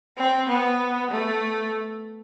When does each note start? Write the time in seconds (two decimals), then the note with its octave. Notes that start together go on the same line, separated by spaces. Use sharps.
0.17 C4
0.48 B3
1.11 A3